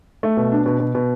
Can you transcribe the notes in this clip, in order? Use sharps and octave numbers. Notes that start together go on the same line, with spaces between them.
A3
B2
D4
B2
B2
B2